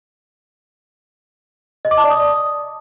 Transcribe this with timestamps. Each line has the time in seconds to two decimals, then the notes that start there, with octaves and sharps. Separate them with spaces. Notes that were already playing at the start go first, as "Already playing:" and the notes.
1.85 D#5
1.91 D6
1.98 A5
2.04 D5
2.10 D#6